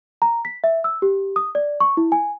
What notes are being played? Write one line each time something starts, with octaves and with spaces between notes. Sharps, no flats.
A#5
B6
E5
E6
G4
D#6
D5
C#6
E4
G#5